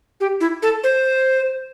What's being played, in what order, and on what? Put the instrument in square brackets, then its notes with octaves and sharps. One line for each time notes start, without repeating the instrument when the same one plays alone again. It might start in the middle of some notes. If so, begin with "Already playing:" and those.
[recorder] G4
E4
A4
C5